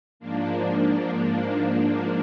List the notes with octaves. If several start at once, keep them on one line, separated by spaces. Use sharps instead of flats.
G#2 F3 A#3 D4